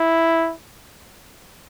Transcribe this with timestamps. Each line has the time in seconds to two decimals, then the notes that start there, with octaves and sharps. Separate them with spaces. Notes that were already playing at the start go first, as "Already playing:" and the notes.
Already playing: E4